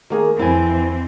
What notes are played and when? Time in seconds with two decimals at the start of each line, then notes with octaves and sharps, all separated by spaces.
0.10 D#3 A#3 G#4
0.39 F2 E3 C4 E4 G#5